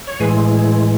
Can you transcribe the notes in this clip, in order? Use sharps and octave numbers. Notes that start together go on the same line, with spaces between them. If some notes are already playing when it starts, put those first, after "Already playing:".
C#5
A2 E3 G#3 G#4 B4